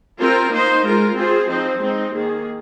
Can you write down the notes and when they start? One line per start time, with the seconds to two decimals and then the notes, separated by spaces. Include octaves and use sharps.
0.19 C4 F4 A#4
0.51 A#3 D#4 C5
0.84 G#3 F4 A#4
1.16 C4 F4 G#4 C5
1.48 F3 C4 D#4 C5
1.81 G#3 C4 D#4
2.13 D#3 A#3 G#4